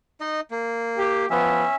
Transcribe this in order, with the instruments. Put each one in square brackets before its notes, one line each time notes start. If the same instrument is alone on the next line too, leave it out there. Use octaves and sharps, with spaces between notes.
[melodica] D#4 D#5
A#3
[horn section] G4
[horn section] F3 B3 [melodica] C#4 E5